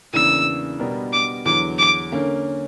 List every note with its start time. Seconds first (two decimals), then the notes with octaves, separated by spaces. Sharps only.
0.13 E2 C#3 E3 A#3 D4 E6
0.79 B2 G3 B3 D4 A#4
1.13 D6
1.46 E2 D3 F#3 D6
1.79 D6
2.12 D3 A#3 C#4